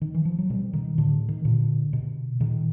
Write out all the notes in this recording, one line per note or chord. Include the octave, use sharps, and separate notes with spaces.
D#3
E3
F3
F#3
B2 G3
D#3
A2 D3
D#3
A#2 D3
B2
A#2 D#3